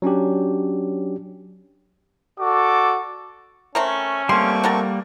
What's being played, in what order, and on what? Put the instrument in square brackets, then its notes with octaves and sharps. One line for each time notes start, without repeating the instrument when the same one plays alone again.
[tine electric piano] F#3 C#4 D4 G4
[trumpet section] F#4 A4 D5 D6
[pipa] A3 C4 A#4 [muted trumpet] C#4
[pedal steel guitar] G3 A#3 [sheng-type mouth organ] A3 C4 C#6 [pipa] C6
[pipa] A4 A#4 F#5